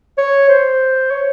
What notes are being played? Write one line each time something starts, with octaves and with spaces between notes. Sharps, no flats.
C#5
C5
C#5